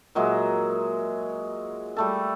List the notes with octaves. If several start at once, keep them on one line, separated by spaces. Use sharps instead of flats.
A#2 F#3 G#3 E5
G3 A3 A4